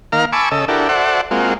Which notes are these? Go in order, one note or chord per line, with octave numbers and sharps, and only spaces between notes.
D#3 A#3 F5 A#5 F6
G#5 A5 B5 C#6 D6 E6
C#3 A4 D#5 E6
D4 E4 F#4 G4 A4 A#4
F#4 A4 C5 D5 E5 F#5
G#3 A#3 C4 F4 F#4